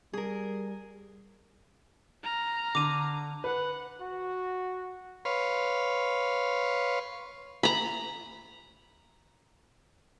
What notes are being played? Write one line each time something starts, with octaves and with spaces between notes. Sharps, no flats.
G3 G#4 A#4
A#5 F6
D3 D6 D#7
B4 F#5
F#4
B4 C#5 F5 C6
A#5 B5